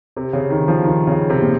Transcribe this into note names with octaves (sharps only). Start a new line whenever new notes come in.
C3
C#3
D#3
F3
D#3
C#3
C3
A#2